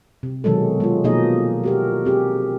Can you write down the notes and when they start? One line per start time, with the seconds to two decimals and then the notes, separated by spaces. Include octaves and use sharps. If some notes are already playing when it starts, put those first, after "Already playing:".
0.23 C3
0.44 B2 D#3 F#3 G#3 A4
0.80 G#3 F4
1.04 B2 F3 A#3 D#4 G#4 D#5
1.64 F#4 G4 A#4
2.05 C4 G4 G#4